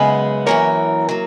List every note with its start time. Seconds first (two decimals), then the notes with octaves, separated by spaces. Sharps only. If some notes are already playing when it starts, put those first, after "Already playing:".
Already playing: F#2 C#3 G#3 B3 G#4 B4
0.46 F#2 E3 A#3 A#4 C#5
1.09 F#3 A#3